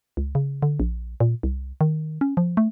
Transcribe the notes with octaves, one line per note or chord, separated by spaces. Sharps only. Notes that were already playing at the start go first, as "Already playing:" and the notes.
C#2
C#3
D3
A#1
A#2
C2
D#3
C#4
F3
A3